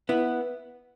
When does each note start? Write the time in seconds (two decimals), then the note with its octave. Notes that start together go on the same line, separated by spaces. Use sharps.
0.09 B3 E4